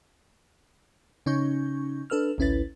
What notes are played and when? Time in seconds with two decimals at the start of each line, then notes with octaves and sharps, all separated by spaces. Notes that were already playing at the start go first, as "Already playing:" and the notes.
1.26 C#3 C#4 D#4 C#6 G6
2.10 D4 A4 B4 E6 F6
2.38 A1 D2 C#4 E4 B4 A6